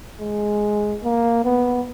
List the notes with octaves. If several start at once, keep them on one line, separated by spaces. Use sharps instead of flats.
G#3
A#3
B3